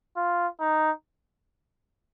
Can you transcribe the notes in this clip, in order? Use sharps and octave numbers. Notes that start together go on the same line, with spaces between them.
F4
D#4